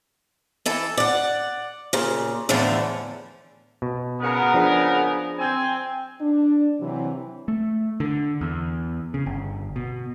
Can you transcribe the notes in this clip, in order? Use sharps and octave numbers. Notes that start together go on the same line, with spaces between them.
E3 A4 E5
D5 F#5
A#2 C#3
E2 A2 D3 E3 F3
B2
C#3 B3 A#4
F3 D4 G#4
C4 G#5
D4
C3 E3 F#3
A3
D3
E2
C#3
G1
B2